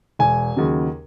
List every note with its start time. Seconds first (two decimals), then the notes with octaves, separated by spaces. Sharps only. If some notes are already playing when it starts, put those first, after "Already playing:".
0.19 E1 G#5
0.56 D#2 C#3 F#3